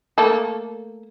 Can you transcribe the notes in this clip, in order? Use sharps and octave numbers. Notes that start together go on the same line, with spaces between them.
A3 A#3 A4